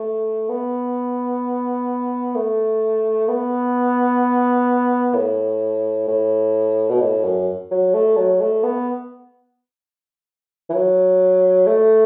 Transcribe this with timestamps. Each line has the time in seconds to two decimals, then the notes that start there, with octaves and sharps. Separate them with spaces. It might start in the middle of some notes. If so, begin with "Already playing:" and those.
Already playing: A3
0.49 B3
2.35 A3
3.28 B3
5.15 A2
6.08 A2
6.89 B2
7.01 A2
7.24 F#2
7.71 F#3
7.94 A3
8.17 F#3
8.41 A3
8.64 B3
10.69 E3
10.74 F#3
11.67 A3